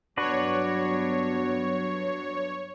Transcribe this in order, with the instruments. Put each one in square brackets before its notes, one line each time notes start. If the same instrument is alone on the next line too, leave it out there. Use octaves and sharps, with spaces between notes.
[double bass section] G2 F#3 B3 [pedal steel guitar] D4 F#4 B4 [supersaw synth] C#5